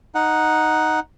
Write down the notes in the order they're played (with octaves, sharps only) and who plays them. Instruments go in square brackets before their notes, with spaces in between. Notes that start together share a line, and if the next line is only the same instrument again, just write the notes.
[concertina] D#4 F#5